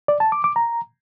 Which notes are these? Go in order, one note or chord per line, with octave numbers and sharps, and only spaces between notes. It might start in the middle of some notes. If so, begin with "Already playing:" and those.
D5
A5
D6
D6
A#5